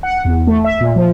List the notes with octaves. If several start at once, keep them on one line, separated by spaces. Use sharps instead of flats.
F#5
E2
A3
E5
A#2
F3